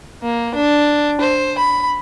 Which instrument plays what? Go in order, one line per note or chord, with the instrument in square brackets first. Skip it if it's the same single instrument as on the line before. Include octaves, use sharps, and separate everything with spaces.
[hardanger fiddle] A#3
D4
C5
B5